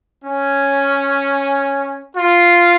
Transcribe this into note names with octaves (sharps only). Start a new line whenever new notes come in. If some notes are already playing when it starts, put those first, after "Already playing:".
C#4
F4